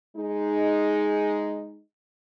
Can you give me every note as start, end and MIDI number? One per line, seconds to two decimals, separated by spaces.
0.16 1.81 56
0.16 1.81 63